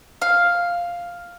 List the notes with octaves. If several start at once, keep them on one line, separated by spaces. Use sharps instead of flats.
F5